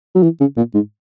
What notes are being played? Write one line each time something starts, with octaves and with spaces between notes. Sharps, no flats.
F#3
E3
C#3
A#2
G#2